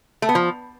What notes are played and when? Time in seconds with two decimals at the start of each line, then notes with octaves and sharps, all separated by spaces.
0.22 A3
0.29 B3
0.35 F3